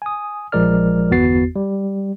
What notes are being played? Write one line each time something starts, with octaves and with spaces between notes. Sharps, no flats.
G#5 D#6
A#1 F3 G#3 A#4 D5 F6
G1 E2 B3 F#4 A6 C7
G3